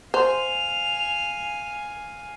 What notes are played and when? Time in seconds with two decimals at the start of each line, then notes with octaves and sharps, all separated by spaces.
0.14 C5 F5 G#5 F7